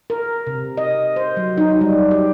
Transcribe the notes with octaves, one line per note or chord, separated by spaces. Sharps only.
A#4
C3
D#5
C5
F#3
D#4
G3
G4